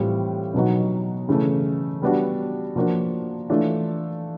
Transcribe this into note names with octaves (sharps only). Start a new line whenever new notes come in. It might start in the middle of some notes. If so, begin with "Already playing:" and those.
Already playing: A2 E3 G3 C4 F4
B2 F#3 B3 D#4 F#4
C#3 E3 A3
G3 B3 D4 F#4
F3 A#3 D4 F#4
E3 A3 D4 F4